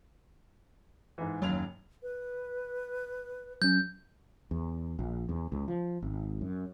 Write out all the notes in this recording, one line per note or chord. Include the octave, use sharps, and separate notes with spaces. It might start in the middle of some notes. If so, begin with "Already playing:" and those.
G#2 E3
F#1 D#2 F#3 F7
B4
F#3 C#4 G6
E2
A#1
E2
C#2
F3
G#1
F#2